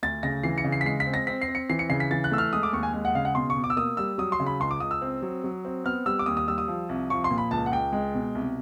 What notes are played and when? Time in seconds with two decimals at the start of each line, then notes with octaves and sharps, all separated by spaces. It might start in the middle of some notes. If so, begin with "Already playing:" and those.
0.03 D2 A6
0.23 C#3 A#6
0.43 E3 C7
0.58 C#7
0.64 C#3
0.72 C7
0.81 B6
0.85 G#3 C7
1.00 B6
1.07 C4
1.14 A#6
1.27 C4 B6
1.41 C7
1.48 C4
1.55 C#7
1.70 E3 C7
1.79 C#7
1.89 C#3 C7
2.00 B6
2.11 E3 A6
2.24 F#6
2.31 A3 E6
2.38 F6
2.53 G#3 D#6
2.63 D6
2.73 D#2 C#6
2.83 G#5
2.93 G#3
3.05 F#5
3.15 C#3 F5
3.25 F#5
3.35 B2 C6
3.50 C#6
3.56 B2
3.64 D6
3.70 E6
3.77 A#3 D#6
3.97 G3 E6
4.18 F#3 D#6
4.32 C6
4.40 C#3
4.46 B5
4.60 C#2 C6
4.71 D6
4.80 C#2 D#6
4.91 E6
5.02 C4
5.22 F#3
5.44 F#3
5.65 C4
5.84 B3 F6
6.06 G3 E6
6.19 D6
6.26 D#2 D#6
6.37 D#6
6.48 G3 E6
6.58 D#6
6.68 F3
6.89 C2
7.10 F3 C#6
7.24 C6
7.31 A#2
7.38 B5
7.51 C#2 A5
7.66 F#5
7.72 C#2 G5
7.92 G#3
8.14 B2
8.35 C2